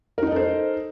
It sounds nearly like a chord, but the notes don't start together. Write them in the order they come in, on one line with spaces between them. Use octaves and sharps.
A#4 D#4 D#5 A4 C5